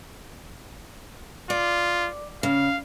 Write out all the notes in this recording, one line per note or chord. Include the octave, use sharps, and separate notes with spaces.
F4 D5
C#3 F5